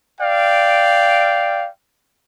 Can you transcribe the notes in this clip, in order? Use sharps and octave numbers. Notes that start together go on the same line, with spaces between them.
D5 F5 G5